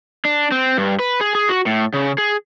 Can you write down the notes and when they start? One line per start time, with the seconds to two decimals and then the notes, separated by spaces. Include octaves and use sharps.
0.25 D4
0.52 C4
0.77 G2
0.99 B4
1.21 G#4
1.35 G#4
1.49 F#4
1.66 A2
1.93 C#3
2.18 G#4